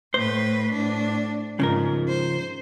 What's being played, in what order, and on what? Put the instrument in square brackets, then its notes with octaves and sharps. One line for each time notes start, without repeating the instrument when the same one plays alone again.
[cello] A2 B4 [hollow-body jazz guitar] C5
[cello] A2 D4
[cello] G#2 [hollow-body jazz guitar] C#3 F3 A#4
[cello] C5